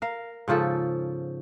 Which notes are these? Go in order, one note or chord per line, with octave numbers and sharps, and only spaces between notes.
A#4 F5
G#2 C#3 F3 A4